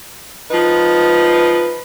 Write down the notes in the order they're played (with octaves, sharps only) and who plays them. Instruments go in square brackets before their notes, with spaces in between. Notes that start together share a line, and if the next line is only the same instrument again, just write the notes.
[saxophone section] F3 D#4 B4